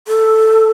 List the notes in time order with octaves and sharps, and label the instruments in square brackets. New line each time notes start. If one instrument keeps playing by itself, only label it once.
[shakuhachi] A4